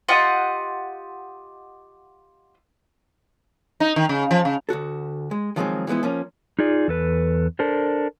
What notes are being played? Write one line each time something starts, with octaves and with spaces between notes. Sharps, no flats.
F4 G4 D#5 F#5
D#4
D#3
C#3
F3
C#3
D2 B2 F#4 A4
G#3
D#3 F3 F#3 G#3 C4 G#4
E3 F3 G#3 B3 E4
F3 A#3 C#4
D#4 F4 G#4 D5
E2 A4 B4
D4 A4 A#4 C5